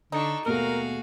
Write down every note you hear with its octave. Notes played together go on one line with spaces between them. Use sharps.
D3 D4 D#4 A4 C#6
D#2 B2 A3 F#4 G#4 A#4 F5